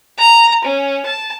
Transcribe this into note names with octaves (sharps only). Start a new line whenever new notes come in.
A#5
C#4
A5